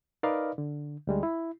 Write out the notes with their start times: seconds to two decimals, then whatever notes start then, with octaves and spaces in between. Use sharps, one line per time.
0.23 D#4 A#4 B4 D5 D#5 F5
0.58 D3
1.07 D2 G3 G#3
1.23 E4